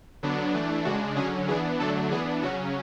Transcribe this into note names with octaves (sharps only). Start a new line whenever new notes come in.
D3 F#3 B3 D4
E3 A3 D4
C#3 G#3 D4 F#4
D3 F#3 C#4 G#4
E3 B3 D4 G#4
D3 F#3 A3 D4 A4
E3 B3 D4 G#4
C#3 F#3 C#4 F#4